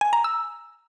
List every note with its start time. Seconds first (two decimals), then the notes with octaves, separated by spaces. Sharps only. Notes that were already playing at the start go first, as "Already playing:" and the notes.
0.01 G#5
0.13 A#5
0.24 E6